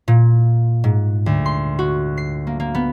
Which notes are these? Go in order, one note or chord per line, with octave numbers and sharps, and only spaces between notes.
A#2
G#2
D2
C6
F#4
C7
A#3
A#3
B3